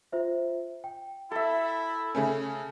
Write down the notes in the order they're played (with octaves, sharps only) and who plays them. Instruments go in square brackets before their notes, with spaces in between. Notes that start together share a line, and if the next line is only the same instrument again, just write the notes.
[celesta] F4 C5 E5
G5
[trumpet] E4 [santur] A4 E5
[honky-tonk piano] C#3 A3 C#4